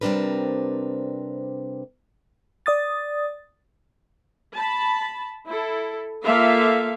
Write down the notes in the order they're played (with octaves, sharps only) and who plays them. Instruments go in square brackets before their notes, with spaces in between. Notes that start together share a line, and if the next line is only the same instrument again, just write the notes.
[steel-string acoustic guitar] C3 G3 C4 D4 A#4 B4
[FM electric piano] D5 D#6 A6
[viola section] A5 B5
E4 A4
A#3 F4 A4 E5 F5